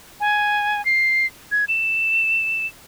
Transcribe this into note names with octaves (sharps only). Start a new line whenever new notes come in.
G#5
C7
G#6
E7